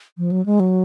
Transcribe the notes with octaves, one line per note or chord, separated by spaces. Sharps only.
F3
F#3
G#3
F#3